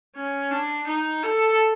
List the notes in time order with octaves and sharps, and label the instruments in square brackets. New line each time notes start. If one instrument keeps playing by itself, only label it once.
[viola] C#4
D4
D#4
A4